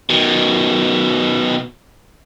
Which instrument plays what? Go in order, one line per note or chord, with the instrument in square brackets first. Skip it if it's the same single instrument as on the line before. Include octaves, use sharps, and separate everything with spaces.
[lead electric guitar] B2 D#3